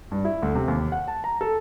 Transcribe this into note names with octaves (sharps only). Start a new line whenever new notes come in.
G2
E4
D2
C3
D#2
F#5
A5
A#5
A4